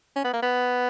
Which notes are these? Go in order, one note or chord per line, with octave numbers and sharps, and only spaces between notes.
C#4
B3
A#3
B3